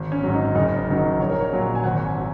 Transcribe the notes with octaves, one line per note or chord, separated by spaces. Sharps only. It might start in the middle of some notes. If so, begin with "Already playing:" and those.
Already playing: G#1
C#4
G#2 F#3
D#4
F#1 D#4
D#4
F#2 D#3 F#3
D#4
A#1 C#5
A#4
C#5
A#2 F#3
G#5
G#1 F#5
G#5
F#3